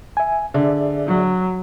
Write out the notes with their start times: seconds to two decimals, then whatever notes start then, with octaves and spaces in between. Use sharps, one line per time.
0.17 E5 G#5
0.54 D3 G#4 D5 E5
1.07 F#3